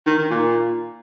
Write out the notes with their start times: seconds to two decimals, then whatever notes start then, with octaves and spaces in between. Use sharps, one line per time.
0.06 D#3
0.18 D#3
0.30 A#2